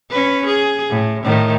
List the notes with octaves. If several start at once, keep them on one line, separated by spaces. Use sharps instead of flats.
C#4 B4
G#4
A2
A2 D#3